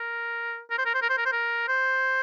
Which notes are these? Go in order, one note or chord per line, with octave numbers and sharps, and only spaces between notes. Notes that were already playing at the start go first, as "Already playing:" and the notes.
Already playing: A#4
A#4
C5
A#4
C5
A#4
C5
A#4
C5
A#4
C5